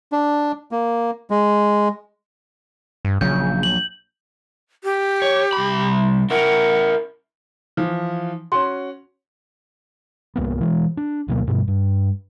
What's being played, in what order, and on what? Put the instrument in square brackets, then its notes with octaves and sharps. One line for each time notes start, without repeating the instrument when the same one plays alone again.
[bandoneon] D4
A#3
G#3
[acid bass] G2
[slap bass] A#1 F#3 [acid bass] C#3 [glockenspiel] G6
[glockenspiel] F#7
[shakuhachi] G4
[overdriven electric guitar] C#5
C2 B5
[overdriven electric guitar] E4 A#4 [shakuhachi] F#5
[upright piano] E3 F3
[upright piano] C#4 F#4 [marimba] C6
[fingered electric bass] C2 F2 A#3 B3
E3 G#3
D4
D2 B2 F#3 A#3
G2 B2 G3
G2